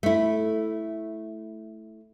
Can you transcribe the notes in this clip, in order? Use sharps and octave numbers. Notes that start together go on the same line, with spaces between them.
A3 E4